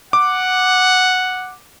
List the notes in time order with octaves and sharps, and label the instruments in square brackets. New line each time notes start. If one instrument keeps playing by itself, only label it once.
[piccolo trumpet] F#5 [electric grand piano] D6